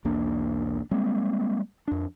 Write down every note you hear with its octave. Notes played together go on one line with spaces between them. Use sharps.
B1 E2 A#3 D4
G3 G#3 A#3 C4
F2 D4